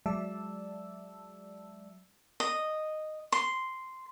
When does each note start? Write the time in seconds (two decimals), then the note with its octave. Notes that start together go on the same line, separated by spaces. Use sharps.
0.06 F#3 G#3 D5 E5 A5 E6
2.40 D#5
3.32 C6